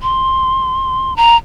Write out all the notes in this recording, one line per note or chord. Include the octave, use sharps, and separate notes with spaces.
C6
A#5